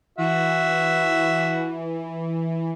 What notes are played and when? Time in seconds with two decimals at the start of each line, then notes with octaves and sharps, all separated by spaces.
0.18 E3 F#4 E5